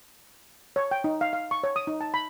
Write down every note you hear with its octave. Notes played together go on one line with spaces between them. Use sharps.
C#5
G5
D#4
F5
F5
C#6
C#5
D#6
D#4
A5
B5